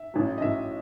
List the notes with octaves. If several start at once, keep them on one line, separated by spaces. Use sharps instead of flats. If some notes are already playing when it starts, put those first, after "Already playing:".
Already playing: E5
A1 A2 F#3
D#5
A1 A2 F#3 E5